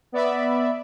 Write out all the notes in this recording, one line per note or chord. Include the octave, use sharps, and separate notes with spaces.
B3 D5 E5 B5